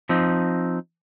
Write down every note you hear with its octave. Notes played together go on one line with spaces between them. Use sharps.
F3 C4 D#4